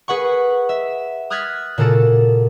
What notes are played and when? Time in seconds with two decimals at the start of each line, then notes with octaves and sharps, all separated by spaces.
0.08 G#4 B4 F#5 C#6
0.69 E5
1.30 D#6 F6 F#6 G#6 A6 B6
1.78 A#2 C#3 F#4 A4 A6